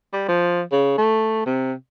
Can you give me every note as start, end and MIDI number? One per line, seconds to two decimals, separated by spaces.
0.13 0.26 55
0.28 0.62 53
0.72 0.97 49
0.98 1.44 57
1.46 1.73 48